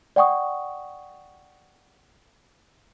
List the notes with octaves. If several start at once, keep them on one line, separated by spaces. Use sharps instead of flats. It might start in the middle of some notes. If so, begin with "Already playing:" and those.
D5 F#5 G5 C#6 D#6